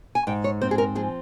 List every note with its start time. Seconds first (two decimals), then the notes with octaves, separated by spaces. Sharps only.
0.15 G#5
0.27 G#2 G5
0.44 C#5
0.61 C4 C5
0.71 G#4
0.78 A#4
0.95 F3 G#4